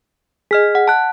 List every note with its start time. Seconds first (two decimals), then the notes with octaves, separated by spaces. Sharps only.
0.51 G#4 D#5 F6 B6
0.75 F#5
0.88 A5 F#6